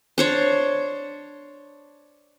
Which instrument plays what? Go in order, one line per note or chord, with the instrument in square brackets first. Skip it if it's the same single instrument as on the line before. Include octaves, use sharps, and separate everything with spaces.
[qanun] D4 C5 C#5